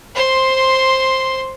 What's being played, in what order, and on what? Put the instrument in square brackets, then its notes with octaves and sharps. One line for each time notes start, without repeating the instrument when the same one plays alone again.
[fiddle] C5 C6